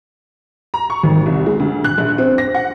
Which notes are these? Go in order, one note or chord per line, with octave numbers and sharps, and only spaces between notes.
A#5
C#6
G#1
C2
G#3
D2
F#6
A#1
C4
A#6
F#5